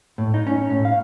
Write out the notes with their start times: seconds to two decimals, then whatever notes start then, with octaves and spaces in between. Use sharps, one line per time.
0.18 A2
0.34 D#4
0.47 C#4
0.70 A2
0.85 F5